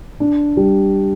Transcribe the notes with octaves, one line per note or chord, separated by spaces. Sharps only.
D4
G3